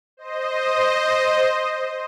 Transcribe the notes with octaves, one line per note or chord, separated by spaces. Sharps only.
C5 D#5